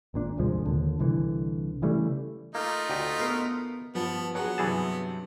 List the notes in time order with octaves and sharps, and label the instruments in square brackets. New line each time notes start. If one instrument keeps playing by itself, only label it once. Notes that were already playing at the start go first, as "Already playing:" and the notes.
[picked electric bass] G#1 A#2 D4
D#1 C2 F3 G#3
D#2 D3
C2 D3 E3
C#3 E3 G3 A3
[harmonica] A3 D#4 F4 [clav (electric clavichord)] A#3
[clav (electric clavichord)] D2 G4 D#5
[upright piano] B3 A#4 C7
[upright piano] G2 F3 [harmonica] B3
[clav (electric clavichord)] F#3 [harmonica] B3 [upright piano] F#4 G#4 F#5
[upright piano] G2 C3 F#3 [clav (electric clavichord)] E3 G#4 A5